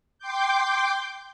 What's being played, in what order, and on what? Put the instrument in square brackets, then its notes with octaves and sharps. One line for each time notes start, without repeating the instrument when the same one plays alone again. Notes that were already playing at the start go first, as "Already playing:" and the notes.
[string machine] G5 C6 D6 G6